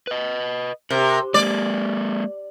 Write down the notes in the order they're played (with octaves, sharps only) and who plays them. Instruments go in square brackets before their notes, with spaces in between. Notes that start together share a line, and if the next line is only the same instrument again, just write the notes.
[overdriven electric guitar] B4 D#5
[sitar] C3 [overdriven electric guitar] A#4
[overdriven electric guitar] G#3 A#3 [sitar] D5